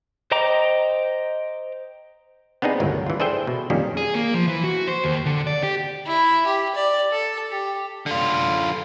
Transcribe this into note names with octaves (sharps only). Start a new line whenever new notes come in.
C5 D#5 G5 A#5 D6
B3 C4 D4 D#4 G#4
G1 C#2 A2 F#3 A#4
E3 F4
D4 G#4 A4 C5 E5 G5
B2
F2 A#2 D#3 G3 A#3 C#4
G#4
A#3
F3
E3
F#4
C5
D#2
D3
D5
G4
E4
G4
D5
A4
G4
D3 F4